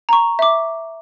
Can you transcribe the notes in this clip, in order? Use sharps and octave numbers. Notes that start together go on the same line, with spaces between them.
A#5 C#6
E5 D6